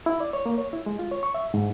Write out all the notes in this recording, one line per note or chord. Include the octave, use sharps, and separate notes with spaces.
E4
D5
C#5
A#3
C#5
E4
G#3
F4
C#5
C#6
E5
G#2